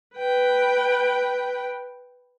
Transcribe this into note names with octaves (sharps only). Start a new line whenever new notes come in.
B4 G5